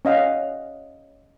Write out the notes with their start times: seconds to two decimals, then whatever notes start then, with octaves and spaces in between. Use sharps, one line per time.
0.05 C#4 D#5 F5 F#5